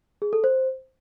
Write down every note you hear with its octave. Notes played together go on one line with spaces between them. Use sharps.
G#4
A4
C5